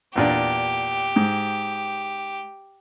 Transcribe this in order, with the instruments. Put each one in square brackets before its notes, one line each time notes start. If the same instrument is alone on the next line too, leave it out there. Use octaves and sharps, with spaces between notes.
[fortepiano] E2 A#2 D4 [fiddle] G4
[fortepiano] G#2